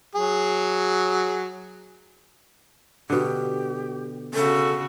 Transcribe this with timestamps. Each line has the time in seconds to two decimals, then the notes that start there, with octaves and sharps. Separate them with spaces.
0.15 F#3 G#4
3.10 B2 D3 G4
4.34 C#3 F#4 A4